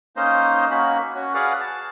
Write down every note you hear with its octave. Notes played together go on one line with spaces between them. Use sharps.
A#3 C#4 D#4 C5 D#5
A#3 C#4 F#4 B5
C#4 F#4
F#4 G#4 B4 D5 F5 F#5
A5